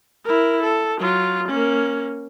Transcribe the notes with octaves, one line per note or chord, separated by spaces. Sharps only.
E4 A#4
A4
F#3 F4
A#3 C#4